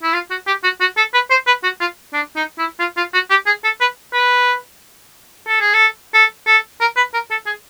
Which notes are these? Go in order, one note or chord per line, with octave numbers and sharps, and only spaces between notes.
E4
F4
F#4
G4
F#4
F#4
A4
B4
C5
B4
F#4
F4
D4
D#4
E4
F4
F4
F#4
G4
G#4
A4
B4
B4
A4
G#4
A4
A4
A4
A#4
B4
A#4
A4
G#4